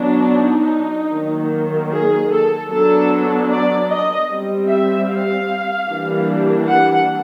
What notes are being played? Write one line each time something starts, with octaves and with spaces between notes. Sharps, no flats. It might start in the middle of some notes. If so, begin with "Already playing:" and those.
Already playing: F#3 B3 D4
D#4
D#3 F#3 A#3
G#4
A4
F#3 B3 D4 A4
D5
D#5
G3 C4
E5
F5
E3 G3 A#3 D4
F#5